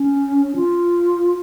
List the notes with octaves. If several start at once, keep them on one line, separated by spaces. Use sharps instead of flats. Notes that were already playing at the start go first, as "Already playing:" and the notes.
Already playing: C#4
F4